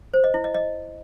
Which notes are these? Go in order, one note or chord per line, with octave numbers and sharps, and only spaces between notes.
C5
D#5
E4
D#5
D#5